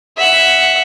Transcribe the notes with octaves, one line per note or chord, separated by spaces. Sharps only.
E5 F#5